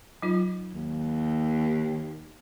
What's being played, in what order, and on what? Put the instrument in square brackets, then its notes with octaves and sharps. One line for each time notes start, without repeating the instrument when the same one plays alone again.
[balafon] F#3 D#4 F4
[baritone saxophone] D#2